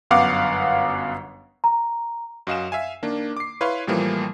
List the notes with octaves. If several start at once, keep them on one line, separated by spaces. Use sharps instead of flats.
G1 F#2 B3 F5 F#5 D6
A#5
F#2 F#4 D#5 F5 G#5 E7
E5 F5 G#5
D#3 A#3 D4
D6 C7
E4 B4 C#5 F5 C6
A2 E3 F3 G3 A#3